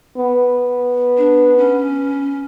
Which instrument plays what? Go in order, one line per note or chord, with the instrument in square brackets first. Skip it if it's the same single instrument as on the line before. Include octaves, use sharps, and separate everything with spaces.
[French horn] B3
[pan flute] D4
C#4